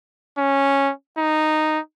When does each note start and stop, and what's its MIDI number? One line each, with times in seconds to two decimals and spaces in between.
0.38 0.91 61
1.18 1.79 63